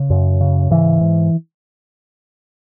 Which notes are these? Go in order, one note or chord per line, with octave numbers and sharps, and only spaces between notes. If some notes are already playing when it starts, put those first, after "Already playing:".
Already playing: C#3
F#2
C#3
G#2 E3
G#2